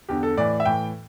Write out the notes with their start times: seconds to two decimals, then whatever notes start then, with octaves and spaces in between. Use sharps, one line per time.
0.09 E2 D3 G4
0.23 A4
0.37 A2 E3 D5
0.60 E5
0.65 A2 E3 G5